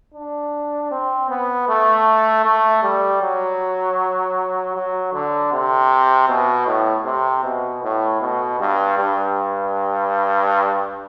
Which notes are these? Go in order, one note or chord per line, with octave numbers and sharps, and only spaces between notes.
D4
C4
B3
A3
A3
G3
F#3
F#3
D3
C3
B2
A2
C3
B2
A2
B2
G2
G2